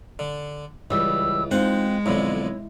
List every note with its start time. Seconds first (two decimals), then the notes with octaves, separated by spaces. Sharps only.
0.19 D3
0.91 C#2 E3 G3 E6
1.51 G#3 C4 D#4 F4 F#5
2.06 B1 F2 D3 E4 C#5